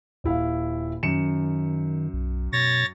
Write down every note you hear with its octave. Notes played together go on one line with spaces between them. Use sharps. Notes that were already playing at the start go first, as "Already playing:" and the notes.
D#1 E4 F5
F#2 D#3 C#7 E7
B1
B2 C#5 A6 A#6